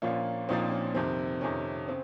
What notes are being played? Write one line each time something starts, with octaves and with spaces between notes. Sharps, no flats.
A#1 A#2 F3 A#3 C#4 F4
A#1 A#2 F3 A#3 C4 D#4
C#4
F2 C3 D#3 C4
F2 C3 D#3 C#4
C#3 C4